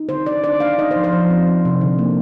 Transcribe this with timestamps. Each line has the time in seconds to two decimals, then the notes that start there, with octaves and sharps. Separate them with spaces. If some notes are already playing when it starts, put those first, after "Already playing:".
Already playing: D#4
0.09 D3 C5
0.26 D4 D5
0.44 D4 D5
0.60 D4 F5
0.78 D#4 D#5
0.91 C5
0.96 F3
1.04 C5
1.13 F3
1.30 C4
1.47 C4
1.65 C3
1.81 D3
1.99 A#3